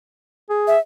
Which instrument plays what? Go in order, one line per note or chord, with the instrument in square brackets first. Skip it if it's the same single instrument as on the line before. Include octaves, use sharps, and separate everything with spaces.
[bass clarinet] G#4
[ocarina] E5